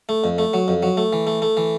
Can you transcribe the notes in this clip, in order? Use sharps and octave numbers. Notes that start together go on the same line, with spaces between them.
A3
F2
A3
F#3
F2
F#3
A3
E3
A3
A3
E3